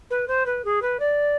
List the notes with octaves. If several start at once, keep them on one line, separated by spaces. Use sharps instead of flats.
B4
C5
B4
G#4
B4
D5